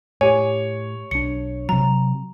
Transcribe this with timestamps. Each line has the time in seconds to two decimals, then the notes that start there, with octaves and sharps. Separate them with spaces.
0.21 A2 G4 C#5 G#5
1.11 B1 D4 C#7
1.69 C3 F#3 A#5